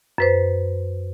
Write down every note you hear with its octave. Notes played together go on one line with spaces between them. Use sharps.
F#2 B4 C5